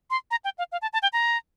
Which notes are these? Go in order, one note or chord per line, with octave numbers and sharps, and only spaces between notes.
C6
A#5
G5
F5
F5
A5
A5
G5
A#5